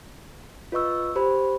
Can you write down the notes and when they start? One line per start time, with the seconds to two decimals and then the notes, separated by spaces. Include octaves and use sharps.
0.72 F4 B4 D#5 C#6 E6
1.16 G4 C5 B5